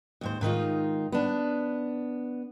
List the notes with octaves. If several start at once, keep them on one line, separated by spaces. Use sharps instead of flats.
D#2 G#2 C5
G#2 D#3 D#4 F4
B3 D4